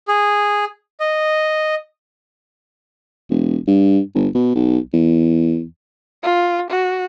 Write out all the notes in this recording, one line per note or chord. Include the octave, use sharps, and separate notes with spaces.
G#4
D#5
E1
G2
G1
B2
B1
E2
F4
F#4